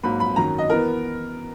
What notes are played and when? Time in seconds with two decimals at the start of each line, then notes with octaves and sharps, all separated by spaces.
0.03 G#2 F#3 A#3 B5
0.20 B5
0.36 F#2 D#3 F#3 A#5
0.58 D#5
0.70 E3 B3 A#4